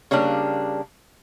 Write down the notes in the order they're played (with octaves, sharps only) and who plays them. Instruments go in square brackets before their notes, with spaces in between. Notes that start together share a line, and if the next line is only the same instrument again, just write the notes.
[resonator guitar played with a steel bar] C#3 G3 A#3 D4